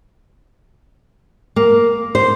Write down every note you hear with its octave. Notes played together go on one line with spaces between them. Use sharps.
A#3
C5